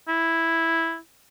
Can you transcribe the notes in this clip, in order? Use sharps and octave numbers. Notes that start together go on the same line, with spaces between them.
E4